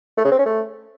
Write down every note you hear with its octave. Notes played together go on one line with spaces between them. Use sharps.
A3
C#3
C4
C#4
A3